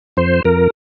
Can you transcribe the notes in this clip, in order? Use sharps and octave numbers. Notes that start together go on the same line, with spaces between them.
F2 C5
F2 A#4